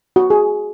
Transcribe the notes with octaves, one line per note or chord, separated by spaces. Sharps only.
F#4
G#4